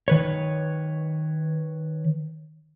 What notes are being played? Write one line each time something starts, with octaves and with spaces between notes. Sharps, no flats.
D#3 B4 C#5